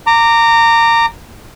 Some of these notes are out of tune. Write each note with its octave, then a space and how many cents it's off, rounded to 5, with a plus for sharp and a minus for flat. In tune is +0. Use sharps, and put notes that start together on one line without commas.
A#5 -20 D6 +0